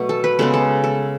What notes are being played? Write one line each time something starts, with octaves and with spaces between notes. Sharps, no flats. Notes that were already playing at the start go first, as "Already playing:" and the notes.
Already playing: B2 F#3 A3 F#4
A4
B4
C#3 G#3 B3 A4
A4
A4